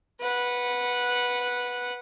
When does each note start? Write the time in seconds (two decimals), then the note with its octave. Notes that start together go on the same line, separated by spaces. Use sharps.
0.20 B4 F#5